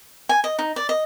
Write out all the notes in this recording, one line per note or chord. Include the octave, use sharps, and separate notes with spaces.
G#5
D#5
D#4
D5
D#5